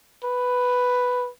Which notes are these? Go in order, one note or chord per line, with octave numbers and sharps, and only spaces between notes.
B4